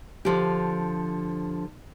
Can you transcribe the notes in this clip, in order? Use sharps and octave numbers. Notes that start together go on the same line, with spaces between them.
D3 F3 G4